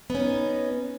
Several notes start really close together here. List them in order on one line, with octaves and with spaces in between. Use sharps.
B3 C#4 D#4